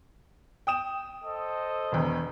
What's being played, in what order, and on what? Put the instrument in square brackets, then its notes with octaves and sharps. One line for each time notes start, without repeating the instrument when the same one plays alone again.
[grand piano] G5 D#6 E7
[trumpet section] A4 C5 D#5
[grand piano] E1 E2